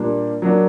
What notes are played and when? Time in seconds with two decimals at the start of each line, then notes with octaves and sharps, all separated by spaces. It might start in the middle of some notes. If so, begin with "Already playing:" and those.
Already playing: A#2 G3 A#3 D4
0.42 F#3 A#3 D4